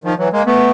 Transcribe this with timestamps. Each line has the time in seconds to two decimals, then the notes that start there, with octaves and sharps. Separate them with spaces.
0.04 D#3 F3
0.18 E3 F#3
0.33 G#3 A#3
0.46 A3 B3